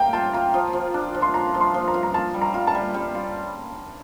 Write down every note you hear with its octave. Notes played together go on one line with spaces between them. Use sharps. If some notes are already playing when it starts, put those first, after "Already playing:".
Already playing: A#3 F5 G5 A#5
F4 A5
F4 A#5
F3
F3
D4
F3
C6
F4 A#5
F3
C6
F3
A#5
F4
A#5
F4 A5
G3
A#5
F4
A5
G3
G3
F4